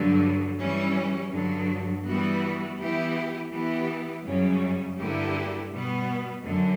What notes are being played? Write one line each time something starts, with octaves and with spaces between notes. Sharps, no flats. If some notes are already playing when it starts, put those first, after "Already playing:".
Already playing: G2 D3 F#3
E3 G3 C#4
G2 D3 F#3
E3 G3 B3 F#4
E3 B3 E4 G4
E3 B3 E4 G4
F#2 C#3 G3 C#4
G2 D3 A#3 E4 G4
B2 G3 B3
F#2 D3